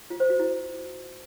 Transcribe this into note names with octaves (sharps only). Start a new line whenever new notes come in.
F4
C5
F#4
E4